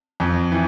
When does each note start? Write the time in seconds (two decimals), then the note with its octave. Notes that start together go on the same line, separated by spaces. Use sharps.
0.20 F2
0.52 E3